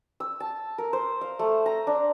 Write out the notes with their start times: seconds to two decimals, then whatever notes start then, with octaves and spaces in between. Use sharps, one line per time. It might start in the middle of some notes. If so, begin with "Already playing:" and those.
0.20 E6
0.40 A5
0.78 A#4
0.93 C5
1.21 F5
1.39 A3
1.66 A#5
1.87 D4